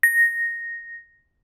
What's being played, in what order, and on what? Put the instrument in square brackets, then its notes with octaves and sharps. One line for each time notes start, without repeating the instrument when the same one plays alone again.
[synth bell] A#6